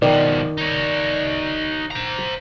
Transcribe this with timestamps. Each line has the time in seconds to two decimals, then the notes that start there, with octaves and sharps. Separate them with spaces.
0.02 B2 D#3 F3 D5
0.57 D#4 C#5
1.91 C5 A#5